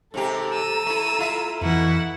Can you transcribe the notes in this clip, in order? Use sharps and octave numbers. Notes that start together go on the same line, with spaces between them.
G#2 C3 G4 A4 A#5
E6 D#7
A3 E4
E4 F4 E5
F2 B2 E3 E4 F#5